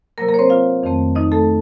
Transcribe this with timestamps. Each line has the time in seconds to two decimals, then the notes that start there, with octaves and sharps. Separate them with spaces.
0.18 C3 F#3 A#3 A#4
0.28 A#3 A#4
0.34 C#5
0.39 C4 C5
0.50 F4 F5
0.83 F2 D#3 A3 C4
1.15 D#4 D#5
1.32 A3 A4